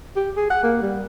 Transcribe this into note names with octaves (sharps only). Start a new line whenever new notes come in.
G4
G#4
F#5
A#3
G3